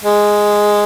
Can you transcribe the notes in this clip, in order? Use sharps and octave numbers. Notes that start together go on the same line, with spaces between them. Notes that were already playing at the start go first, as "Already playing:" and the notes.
G#3